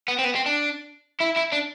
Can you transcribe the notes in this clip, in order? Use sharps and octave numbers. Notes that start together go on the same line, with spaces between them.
B3
C4
B3
C4
D4
E4
E4
D4